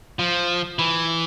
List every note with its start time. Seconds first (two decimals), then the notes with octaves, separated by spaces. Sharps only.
0.19 F3
0.79 E3